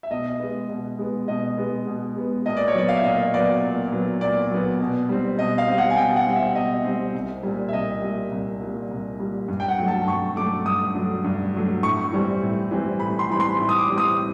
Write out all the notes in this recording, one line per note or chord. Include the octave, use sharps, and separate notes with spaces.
E5
B2 D#5
G#3 B3
B2
G#3 B3
B2 D#5
G#3 B3
B2
G#3 B3
A#2 D#5
D5
C#5
F#3 B3 D5
F5
E5
A#2 D#5
F#3 B3 D5
A#2
F#3 B3
A#2 D5
F#3 B3
B2
G3 C4
B2 D#5
F5
G3 C4
F#5
G#5
B2 G5
F#5
G3 C4
E5
B2 D#5
G3 C4
C2
A#2 G3
E5
C2 D#5
A#2 G3
C2
A#2 G3
C2
A#2 G3
G2
G5
F#5
D3 F#3 A3
A5
G2 C#6
D3 F#3 A3 D6
G2 D#6
D3 F#3 A3
G2
D3 F#3 A3
A2 C#6
E3 G3 C4
A2
E3 G3 C4
A2 B5
C6
E3 G3 C4 B5
C6
A2
D#6
D6
E3 G3 C4
D#6